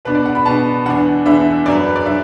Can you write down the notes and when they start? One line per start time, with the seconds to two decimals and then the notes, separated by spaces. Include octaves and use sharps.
0.05 B2 B3 D4 B4
0.15 D5
0.26 F#5
0.35 B5
0.45 B2 B3 D4 A5
0.86 E2 D3 B3 D4 F#5
1.25 E2 D3 B3 D4 E5
1.66 F#2 F#3 D4 D5
1.75 B4
1.86 B4
1.96 D5
2.06 F#3 D4 E5